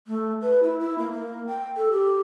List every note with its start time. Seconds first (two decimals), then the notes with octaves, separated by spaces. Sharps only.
0.07 A3
0.41 B4
0.63 E4
0.80 E4
0.98 A#3
1.12 A#3
1.47 G5
1.76 A4
1.92 G4